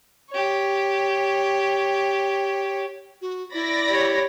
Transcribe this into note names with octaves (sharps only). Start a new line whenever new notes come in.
G4 C#5
F#4
E4 D5 B5 A#6
G4 C#5